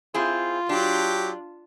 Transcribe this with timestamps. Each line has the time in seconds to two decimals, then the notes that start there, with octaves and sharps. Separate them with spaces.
0.14 C4 E4 F4 G#4
0.69 F#3 D4 G4